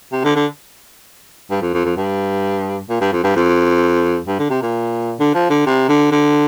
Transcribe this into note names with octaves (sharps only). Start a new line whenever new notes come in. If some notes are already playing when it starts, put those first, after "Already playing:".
C3
D3
D3
G2
F2
F2
F2
G2
A#2
G2
F2
G2
F2
G2
D3
C3
A#2
D3
F3
D3
C3
D3
D3